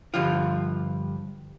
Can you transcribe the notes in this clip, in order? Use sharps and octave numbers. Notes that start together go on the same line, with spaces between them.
G2 D3 F3 F4